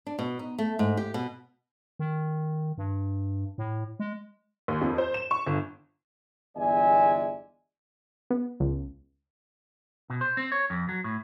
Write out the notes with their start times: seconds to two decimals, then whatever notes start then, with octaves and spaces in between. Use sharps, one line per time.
0.06 D4
0.19 B2
0.39 D#4
0.58 A3
0.79 G#2
0.97 G4
1.14 B2
1.99 D#3
2.78 G2
3.58 A2
3.99 G#3
4.68 D#2
4.82 F2
4.98 C5
5.14 E7
5.31 C#6
5.46 G1
6.56 G1 E2 G#3 D5 E5 G#5
8.30 B3
8.60 C#2
10.10 B2
10.21 C5
10.37 C4
10.52 C#5
10.70 F2
10.89 F#3
11.04 A2